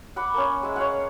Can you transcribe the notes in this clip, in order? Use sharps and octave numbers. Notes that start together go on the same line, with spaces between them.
F#5 B5 D6
A#3 C#4
G#3 E5
C#5 F5 F#5